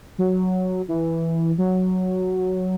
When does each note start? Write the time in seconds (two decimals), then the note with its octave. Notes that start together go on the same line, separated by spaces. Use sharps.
0.18 F#3
0.88 E3
1.58 F#3